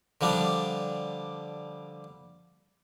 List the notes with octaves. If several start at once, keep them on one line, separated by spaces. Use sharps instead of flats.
D3 F3 G3 D4